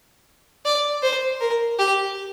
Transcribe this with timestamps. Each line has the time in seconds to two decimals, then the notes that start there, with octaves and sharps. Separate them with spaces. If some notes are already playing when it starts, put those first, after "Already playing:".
0.65 D5
1.03 C5
1.41 A#4
1.79 G4